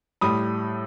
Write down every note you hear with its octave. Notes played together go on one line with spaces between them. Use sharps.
A2 G3 B5 D#6